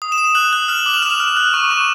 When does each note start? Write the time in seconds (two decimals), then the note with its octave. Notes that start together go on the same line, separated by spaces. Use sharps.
0.02 D#6
0.12 E7
0.18 D#6
0.24 E7
0.35 F#6 F#7
0.53 F#6
0.68 F6 F#7
0.86 D6 F#7
0.94 F7
1.02 F6 E7
1.10 F7
1.20 F6
1.37 F#6
1.54 C#6
1.70 C#6 E7